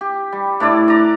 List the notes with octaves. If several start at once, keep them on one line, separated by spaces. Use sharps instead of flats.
G4
G3
A2 D4 E4 D5
D5 A#5